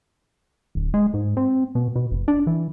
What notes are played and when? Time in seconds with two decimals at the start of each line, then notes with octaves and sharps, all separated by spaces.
0.75 D1
0.94 G#3
1.14 G#2
1.37 C4
1.75 B2
1.96 B2
2.11 F#1
2.28 D4
2.47 E3